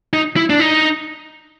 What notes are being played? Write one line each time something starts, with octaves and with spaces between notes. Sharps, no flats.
D#4
E4
D4
D#4